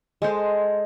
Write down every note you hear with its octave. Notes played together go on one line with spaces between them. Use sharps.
G#3 A4 C5